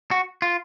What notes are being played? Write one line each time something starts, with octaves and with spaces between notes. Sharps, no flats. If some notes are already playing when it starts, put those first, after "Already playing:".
F#4
F4